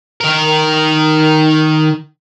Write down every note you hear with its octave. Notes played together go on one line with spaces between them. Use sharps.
D#3 A#4